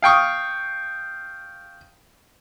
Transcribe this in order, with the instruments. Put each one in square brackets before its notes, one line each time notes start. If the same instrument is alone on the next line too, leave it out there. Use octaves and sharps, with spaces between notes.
[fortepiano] F5 G5 C#6 D#6